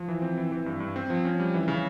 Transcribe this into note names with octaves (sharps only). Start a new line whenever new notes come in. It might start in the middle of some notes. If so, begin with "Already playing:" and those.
Already playing: F3
E3
C4
E3
E3
G2
G2
C4
F3
C#4
G3
E3
C#3